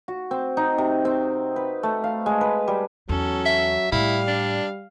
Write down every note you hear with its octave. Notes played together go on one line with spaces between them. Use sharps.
F#4
C4
D#4
C3
C4
B4
A3
F5
G#3
B4
G3
E2 F#3 C#4 A4
E5
A2 G3 A3 E4 F5
D4